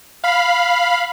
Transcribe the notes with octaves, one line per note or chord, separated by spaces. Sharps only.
F5 B5